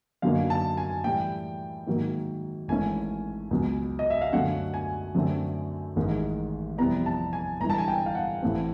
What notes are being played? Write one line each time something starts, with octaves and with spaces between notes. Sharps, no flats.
F#2 D3 F#3 A#3 D#4 F5
A5
G#5
A2 E3 G3 G5
G#2 D#3 F#3 A#3
G#1 G#2 E3 A3 C#4 G#5
C#2 B2 F#3 B3
D#5
E5
F5
F#2 D3 F#3 A3 C#4 F#5
G#5
F#2 D3 F#3 A3 C4
A1 G#2 D#3 G#3
F2 C3 E3 G3 B3 A#5
A5
G#5
G1 G2 E3 A#5
A5
G#5
G5
F5
F#5
A1 A2 E3 A3 C4